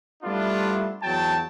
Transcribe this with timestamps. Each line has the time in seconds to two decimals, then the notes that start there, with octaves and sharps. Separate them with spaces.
0.23 G3 A3 B3 D4 E4 F4
1.02 E2 F#3 G5 A5